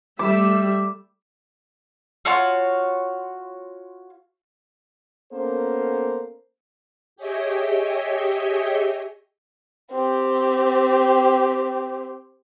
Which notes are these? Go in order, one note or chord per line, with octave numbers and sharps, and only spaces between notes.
G3 A3 E5 D6
F4 F#4 C#5 A5
A#3 B3 C#4 A4 A#4 C5
G4 G#4 C#5 D#5 E5 G5
C4 G4